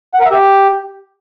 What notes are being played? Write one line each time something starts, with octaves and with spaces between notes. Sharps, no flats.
F#5
A#4
E5
G4